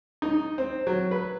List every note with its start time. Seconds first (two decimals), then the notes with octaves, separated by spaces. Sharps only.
0.22 D#4
0.58 C4
0.87 F#3
1.11 B4